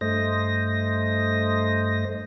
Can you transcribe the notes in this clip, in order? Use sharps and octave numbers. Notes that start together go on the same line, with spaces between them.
G2 A3 C5 D#5 A#6